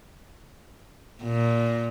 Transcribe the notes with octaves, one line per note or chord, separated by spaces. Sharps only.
A#2